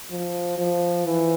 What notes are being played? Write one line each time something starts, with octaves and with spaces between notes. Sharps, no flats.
F3
F3
E3